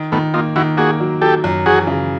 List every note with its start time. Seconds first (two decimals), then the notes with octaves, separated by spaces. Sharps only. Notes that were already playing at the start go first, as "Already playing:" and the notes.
Already playing: D#3
0.12 D#3 A3 B3
0.34 A#3 D#4 F4
0.56 D#3 E4 F#4
0.77 A#3 F#4 G#4
1.00 F#3
1.21 F#3 G4 A4
1.44 F#2
1.66 E3 F#4 G#4
1.87 C#3